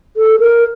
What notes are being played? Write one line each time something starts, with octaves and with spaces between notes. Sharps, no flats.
A4
A#4